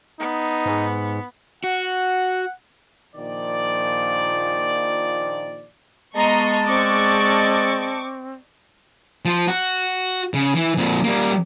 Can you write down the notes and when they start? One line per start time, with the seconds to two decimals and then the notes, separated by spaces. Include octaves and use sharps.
0.20 B3 D#4
0.66 G#2
1.64 F#4 F#5
3.16 A#1 A#2 D#3 F3 D5
6.15 G#3 B3 D#5 A5 A#5 C6 C#6
6.66 C4 D5 D#5 C#6 D6
9.25 F3 C5
9.48 F#4
10.34 C#3
10.55 E3
10.77 F2 A#2
11.04 G3 A#3